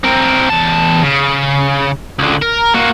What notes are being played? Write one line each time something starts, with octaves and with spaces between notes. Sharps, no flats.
C4 A#4
E2 A5
C#3
C#2 D3
A#4
A#3 F#4